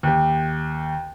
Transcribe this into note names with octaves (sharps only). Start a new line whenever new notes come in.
D#2 G4